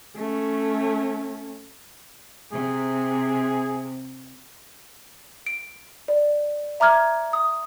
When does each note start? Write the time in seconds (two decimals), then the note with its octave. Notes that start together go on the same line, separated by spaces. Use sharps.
0.16 A3 C#4
2.52 C3 G#4
5.46 D7
6.08 D5
6.80 E5 A#5 D6 F6 G#6
7.33 D#6